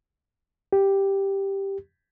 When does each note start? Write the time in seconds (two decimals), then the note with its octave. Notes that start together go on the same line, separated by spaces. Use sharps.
0.73 G4